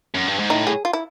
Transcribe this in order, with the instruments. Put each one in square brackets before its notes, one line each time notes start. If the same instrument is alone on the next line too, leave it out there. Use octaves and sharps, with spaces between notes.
[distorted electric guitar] F#2
G2
G#2
[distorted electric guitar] A2 [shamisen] D#4
[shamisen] G#4
F4
E4